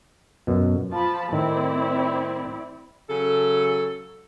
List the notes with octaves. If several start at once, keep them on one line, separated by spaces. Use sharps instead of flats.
F#2 B2
F3 F4 A5 B5
A2 D#3 C4 E4 D5
C#3 F#3 A4